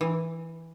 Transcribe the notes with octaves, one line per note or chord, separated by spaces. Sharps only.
E3